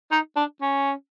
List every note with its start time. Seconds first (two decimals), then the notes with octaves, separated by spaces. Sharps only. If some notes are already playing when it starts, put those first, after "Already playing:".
0.12 D#4
0.36 D4
0.62 C#4